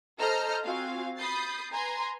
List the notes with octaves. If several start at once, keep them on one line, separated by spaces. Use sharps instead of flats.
A4 C5 D#5 A#5 F6 G6
C4 F4 F#4 F5 G#5
B5 D#6 G6 A6 C7
B4 G#5 A#5 C6